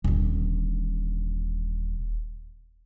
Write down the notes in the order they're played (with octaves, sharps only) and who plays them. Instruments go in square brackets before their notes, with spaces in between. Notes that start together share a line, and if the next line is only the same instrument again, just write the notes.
[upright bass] D#1 D3